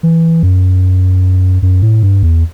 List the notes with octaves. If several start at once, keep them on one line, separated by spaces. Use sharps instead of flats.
E3
F#2
F#2
A2
G2
E2